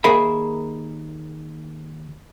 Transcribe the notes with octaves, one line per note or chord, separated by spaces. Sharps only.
D#2 G#4 A#4 C5 E5 B5